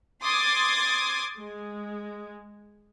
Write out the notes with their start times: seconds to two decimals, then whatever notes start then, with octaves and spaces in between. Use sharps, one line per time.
0.22 C6 D6 D#6 G#6 A6
1.37 G#3